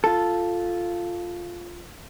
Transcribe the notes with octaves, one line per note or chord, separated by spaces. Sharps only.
F4 A4